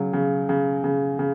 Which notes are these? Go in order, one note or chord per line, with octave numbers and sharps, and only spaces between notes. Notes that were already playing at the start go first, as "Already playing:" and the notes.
Already playing: C#3 F#3
C#3
C#3
C#3
C#3